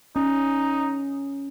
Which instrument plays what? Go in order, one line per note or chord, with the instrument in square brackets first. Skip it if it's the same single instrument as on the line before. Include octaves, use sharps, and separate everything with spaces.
[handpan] C#4 [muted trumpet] D#4